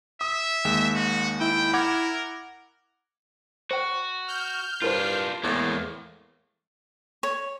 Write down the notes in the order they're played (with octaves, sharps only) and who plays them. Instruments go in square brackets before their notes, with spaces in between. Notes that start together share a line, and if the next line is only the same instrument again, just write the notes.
[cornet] E5 [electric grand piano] D#6
[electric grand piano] D#2 G#3 E7
[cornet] F#4
[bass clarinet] E4 [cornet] G5
[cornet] A#4 [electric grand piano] F#5 D6 G#6
[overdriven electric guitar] F#4 [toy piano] C5 G5
[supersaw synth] F6 G6
[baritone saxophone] G2 [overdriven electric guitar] D4 F4 [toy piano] E4 A#4 C5
[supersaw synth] E2 [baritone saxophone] A2 [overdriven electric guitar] G#3 A#3
[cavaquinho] C#5